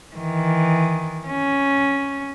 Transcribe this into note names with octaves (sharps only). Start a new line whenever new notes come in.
D#3 E3
C#4